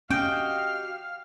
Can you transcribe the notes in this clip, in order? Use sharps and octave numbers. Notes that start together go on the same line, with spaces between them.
C#4 F#4 G4 D#5 F5 G5